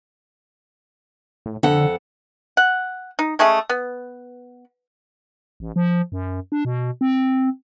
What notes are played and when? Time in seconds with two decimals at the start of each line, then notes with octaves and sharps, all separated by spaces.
1.46 A2
1.63 F2 D3 A4 F#5
2.57 F#5
3.19 D#4
3.39 G#3 A3 C#4 G#4
3.70 B3
5.60 A1
5.76 F3
6.12 F#2
6.52 D4
6.65 B2
7.01 C4